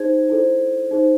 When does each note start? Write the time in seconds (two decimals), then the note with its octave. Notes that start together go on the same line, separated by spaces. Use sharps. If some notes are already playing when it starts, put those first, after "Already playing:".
Already playing: D#4 G#4 C5 G#6
0.30 E4 A4 C5
0.91 D#4 G#4 C5